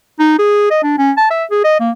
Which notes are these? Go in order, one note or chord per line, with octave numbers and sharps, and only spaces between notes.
D#4
G#4
D#5
D4
C#4
A5
E5
G#4
D#5
A#3